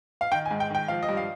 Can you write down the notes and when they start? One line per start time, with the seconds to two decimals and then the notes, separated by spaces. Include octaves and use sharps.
0.21 F5
0.32 D#3 G5
0.46 G#5
0.51 G#2
0.60 G5
0.70 D#3 G5
0.88 F3 F5
1.03 D#5
1.09 G2
1.17 F5